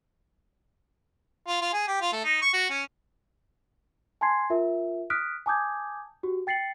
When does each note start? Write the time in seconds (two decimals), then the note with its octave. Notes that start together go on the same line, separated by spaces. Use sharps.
1.48 F4
1.62 F4
1.73 G#4
1.88 G4
2.01 F4
2.12 A3
2.24 D#4
2.42 C#6
2.54 F#4
2.70 C#4
4.21 G#5 A5 C6 G#6 C7
4.50 F4 A#4 E5
5.10 D#6 F6 F#6 B6 D7
5.46 G#5 A5 D6 D#6 G6 G#6
6.23 F#4 G4
6.47 G5 A6 C7 C#7 F#7